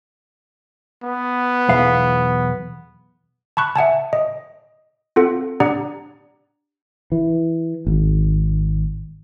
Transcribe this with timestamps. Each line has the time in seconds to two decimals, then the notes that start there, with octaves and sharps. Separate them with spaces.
1.03 B3
1.69 B1 E2 F5
3.57 A5 B5 C#6 F#6
3.76 E5 F#5 G#5 A5
4.13 D#5
5.16 C4 F4 A4 F#5
5.60 D4 G4 D5 F#5 A#5
7.12 E3
7.87 G#1